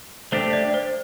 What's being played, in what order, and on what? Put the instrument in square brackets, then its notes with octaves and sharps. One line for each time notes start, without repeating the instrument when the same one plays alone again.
[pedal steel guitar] A3 D4 G4 [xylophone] C5
[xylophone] D5
C5